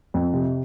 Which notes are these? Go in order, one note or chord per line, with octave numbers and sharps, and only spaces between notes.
F2
C3